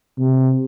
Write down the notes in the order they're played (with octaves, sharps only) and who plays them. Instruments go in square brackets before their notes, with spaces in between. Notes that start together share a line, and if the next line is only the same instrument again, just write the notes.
[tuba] C3